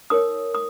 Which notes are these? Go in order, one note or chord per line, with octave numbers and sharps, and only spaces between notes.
D#4 A#4 C#5 D#6
D#6